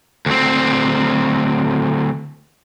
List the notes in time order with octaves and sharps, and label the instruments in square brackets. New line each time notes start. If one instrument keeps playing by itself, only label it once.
[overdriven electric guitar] D2 C4